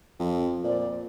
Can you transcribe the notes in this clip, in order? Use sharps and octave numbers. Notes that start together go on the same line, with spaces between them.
F2
A#2 C5 D5